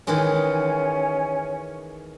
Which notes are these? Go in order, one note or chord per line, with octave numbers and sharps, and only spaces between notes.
D#3 E3 G#3 C#4